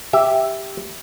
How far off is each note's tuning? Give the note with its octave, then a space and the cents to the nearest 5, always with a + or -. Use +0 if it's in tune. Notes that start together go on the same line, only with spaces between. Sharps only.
G4 +0 E5 +0